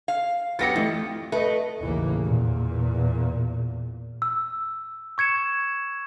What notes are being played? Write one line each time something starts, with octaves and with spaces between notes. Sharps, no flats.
F5
F#3 B3 G4 A6 A#6 C#7
F2 E3 A3
A3 B4 D#5
A1 D#2 C#3 E3 A#3
E2 A#2
E6
C#6 G#6 C#7 E7